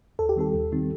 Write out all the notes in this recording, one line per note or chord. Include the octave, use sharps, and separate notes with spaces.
D#2 A4
G4
D#3 G3 C4 D#4 A4
D#2
D#3 G3 C4 D#4